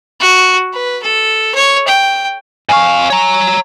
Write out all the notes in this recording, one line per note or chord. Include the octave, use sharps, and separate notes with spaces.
F#4
B4
A4
C#5
G5
F2 F5 G#5 C#6
C#5 A#5